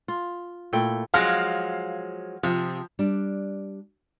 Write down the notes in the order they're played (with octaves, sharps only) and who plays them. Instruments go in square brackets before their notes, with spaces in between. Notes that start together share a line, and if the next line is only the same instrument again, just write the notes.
[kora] F4
A#2 A3 E4 G5
[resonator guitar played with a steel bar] F3 F#3 G#3 [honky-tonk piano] F5 F6
[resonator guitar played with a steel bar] C3 [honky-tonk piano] F3
[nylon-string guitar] G3 D4